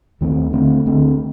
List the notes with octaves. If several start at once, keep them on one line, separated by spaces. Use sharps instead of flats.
D#2 D#3 A3 C4
D2 D3 A3 C4
D2 D3 A3 C4